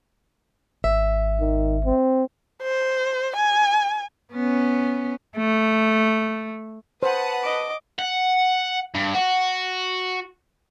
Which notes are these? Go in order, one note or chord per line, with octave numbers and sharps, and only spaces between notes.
G#1 E5
D#3
C4
C5
G#5
B3 C#4
A3
B4 C5 F#5 A5 D#6
D#5 D6
F#5
G2
F#4